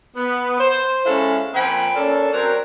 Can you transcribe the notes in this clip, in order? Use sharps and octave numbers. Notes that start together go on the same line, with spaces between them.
B3
C5
G#3 C#4 E4 A4 F5
A#2 F3 C4 G5 G#5 B5
A#3 C#4 D4 A4
F#3 C4 D4 A#4 C5 C#5